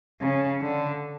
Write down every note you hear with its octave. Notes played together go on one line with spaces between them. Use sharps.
C#3
D3